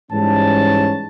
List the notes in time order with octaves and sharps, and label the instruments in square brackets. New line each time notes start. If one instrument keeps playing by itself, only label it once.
[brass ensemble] G#2 E3 G3 C#4 A5